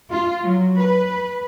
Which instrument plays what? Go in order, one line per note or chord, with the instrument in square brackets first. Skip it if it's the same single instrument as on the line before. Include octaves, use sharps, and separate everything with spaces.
[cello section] F4
F#3
B4